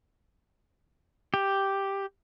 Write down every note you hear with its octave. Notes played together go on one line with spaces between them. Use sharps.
G4